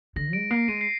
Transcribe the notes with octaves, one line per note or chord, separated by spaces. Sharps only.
D3 A#6
G#3 D7
A#3 C7
G#3 D#7
C7